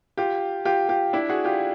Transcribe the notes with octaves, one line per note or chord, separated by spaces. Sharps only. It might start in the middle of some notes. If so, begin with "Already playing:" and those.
F4 G4
F4 G4
F4 G4
D4 E4
F#4 G#4
F4 G4